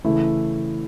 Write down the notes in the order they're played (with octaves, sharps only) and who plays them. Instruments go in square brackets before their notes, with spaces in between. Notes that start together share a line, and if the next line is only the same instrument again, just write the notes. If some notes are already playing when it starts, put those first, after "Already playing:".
[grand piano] C#3 E3 A3 E4